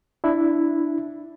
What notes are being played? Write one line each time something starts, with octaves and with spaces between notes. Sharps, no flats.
D4 E4